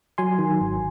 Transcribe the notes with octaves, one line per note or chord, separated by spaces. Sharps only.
F#3 G#5 C6
D#3
G#1